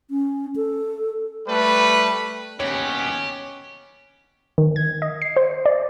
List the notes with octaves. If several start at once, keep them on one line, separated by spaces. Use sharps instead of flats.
C#4
A4
G3 A3 B4
D#2 B3 C#4 G4 C#5
D#3
G#6
D#5
C7
C5
D5